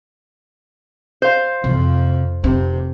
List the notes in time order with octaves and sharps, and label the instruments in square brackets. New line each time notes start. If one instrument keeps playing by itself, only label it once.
[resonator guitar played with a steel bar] C5 F5
[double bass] F2 F3 [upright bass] C3
[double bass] F1 C3 [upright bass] C4